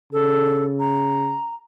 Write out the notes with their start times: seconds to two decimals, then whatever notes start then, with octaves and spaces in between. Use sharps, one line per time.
0.13 C#3 A4
0.80 A#5